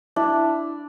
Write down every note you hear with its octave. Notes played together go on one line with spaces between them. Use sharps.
D4 E4